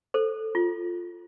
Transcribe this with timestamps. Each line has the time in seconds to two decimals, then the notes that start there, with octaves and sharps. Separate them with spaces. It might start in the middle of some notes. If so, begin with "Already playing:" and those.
0.14 A4 C5
0.55 F4